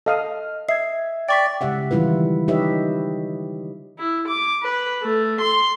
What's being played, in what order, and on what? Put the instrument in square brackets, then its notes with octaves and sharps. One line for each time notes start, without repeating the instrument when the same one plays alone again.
[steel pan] A4 F5 D#6 [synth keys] D#5 F6
[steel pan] D#5 [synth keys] E5 G#6 [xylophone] C7
[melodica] D5 [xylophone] G5 C#6 B6
[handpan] C#3 G#3 G4 E5 F#5
D#3 E3 G3 E4 F4 B4
D#4 G4 B4 C#5 D#5 E5
[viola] E4
D6
B4
A3
C6